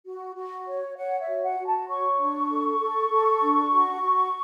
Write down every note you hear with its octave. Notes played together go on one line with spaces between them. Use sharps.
F#4
F#4
C#5
C#5 F#5
E5
F#4
F#5
F#4
A5
C#5 C#6
D4
A4
A4
A4
D4
F#4
F#4